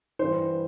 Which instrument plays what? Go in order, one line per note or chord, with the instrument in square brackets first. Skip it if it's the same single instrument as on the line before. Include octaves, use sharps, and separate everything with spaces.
[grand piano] G2 E3 C5